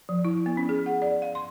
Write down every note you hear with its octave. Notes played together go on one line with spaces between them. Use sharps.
F3
E4
B3
C#4
G#4
F#5
D5
F5
C6